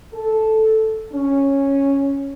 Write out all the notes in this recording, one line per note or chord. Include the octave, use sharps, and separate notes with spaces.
A4
C#4